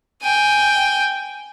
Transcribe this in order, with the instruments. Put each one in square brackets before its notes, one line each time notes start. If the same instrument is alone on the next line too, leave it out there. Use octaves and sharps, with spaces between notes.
[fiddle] G5 G#5